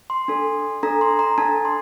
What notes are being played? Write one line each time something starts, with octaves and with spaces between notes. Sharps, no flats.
C6
D4 A4
D4 A4 A#5
C6
A#5
D4 A4 A5
C6